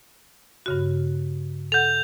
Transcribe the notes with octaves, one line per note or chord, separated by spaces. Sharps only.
G2 C#3 F#4
A4 F#5 G6 F7